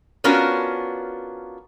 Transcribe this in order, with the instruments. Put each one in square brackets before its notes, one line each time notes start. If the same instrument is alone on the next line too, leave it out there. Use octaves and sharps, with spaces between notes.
[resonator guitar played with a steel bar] B3 C#4 D4 F4 F#4 A#4